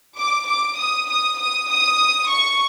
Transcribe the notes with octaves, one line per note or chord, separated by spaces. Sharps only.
D6
D6
D#6
D#6
D#6
D#6
C#6